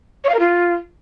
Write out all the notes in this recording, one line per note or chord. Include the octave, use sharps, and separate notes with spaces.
C#5
F5
A#4
F4